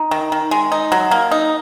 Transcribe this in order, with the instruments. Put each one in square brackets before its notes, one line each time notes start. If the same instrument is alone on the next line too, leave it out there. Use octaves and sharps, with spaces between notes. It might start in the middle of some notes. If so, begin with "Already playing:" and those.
Already playing: [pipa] D#4
D#3
D#3
G#3
D#4
F#3
A#3
D#4